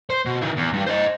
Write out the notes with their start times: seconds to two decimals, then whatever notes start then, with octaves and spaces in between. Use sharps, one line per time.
0.10 C5
0.25 B2
0.41 D#3 E4
0.56 E2
0.73 G2 G4
0.86 C5 D#5